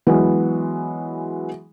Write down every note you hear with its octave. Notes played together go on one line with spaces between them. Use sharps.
E3 F#3 G#3 B3